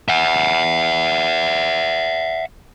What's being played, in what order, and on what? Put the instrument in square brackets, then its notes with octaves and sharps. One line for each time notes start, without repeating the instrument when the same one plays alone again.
[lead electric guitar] E5 F#5